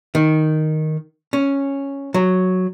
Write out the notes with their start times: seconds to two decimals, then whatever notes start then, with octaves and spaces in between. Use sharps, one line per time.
0.15 D#3
1.33 C#4
2.14 F#3